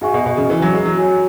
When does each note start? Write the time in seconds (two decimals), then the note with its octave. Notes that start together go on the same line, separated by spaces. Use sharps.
0.01 G#2 F#4 E5 G#5 C#6
0.14 B2
0.26 B2
0.37 C#3
0.50 E3
0.62 F#3
0.74 G#3
0.86 F#3
0.98 F#4 C#5 G#5